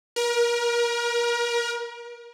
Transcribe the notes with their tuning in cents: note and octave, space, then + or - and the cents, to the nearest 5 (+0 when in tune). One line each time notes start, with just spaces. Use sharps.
A#4 +35